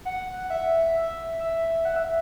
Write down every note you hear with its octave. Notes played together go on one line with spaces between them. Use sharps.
F#5
E5
E5
E5
F#5
E5